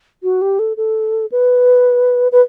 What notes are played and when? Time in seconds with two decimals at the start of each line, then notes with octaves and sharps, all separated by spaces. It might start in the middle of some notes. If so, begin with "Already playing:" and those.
0.23 F#4
0.42 G4
0.59 A4
0.77 A4
1.32 B4
2.32 B4